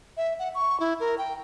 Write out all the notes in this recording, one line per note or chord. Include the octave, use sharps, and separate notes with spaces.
E5
F#5
C#6
E4
A#4
G5